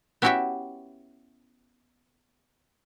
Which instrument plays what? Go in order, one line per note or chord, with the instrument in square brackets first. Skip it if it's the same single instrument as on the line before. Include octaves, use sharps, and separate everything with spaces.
[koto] B3 C#4 E4 F#4 G4 E5